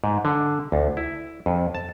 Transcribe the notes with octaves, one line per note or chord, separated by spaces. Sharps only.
G#2
D3
D2
E4
F2
A5